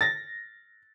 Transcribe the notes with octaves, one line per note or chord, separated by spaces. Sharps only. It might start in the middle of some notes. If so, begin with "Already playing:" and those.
A6 A#6